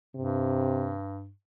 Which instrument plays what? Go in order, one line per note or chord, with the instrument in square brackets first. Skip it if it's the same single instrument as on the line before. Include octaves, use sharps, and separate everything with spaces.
[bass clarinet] G2 [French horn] C3